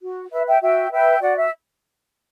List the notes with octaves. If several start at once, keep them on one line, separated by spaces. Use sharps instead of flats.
F#4
B4 E5
E5 G5
F#4 E5 G5
B4 E5 G5
F#4 D5 F#5
E5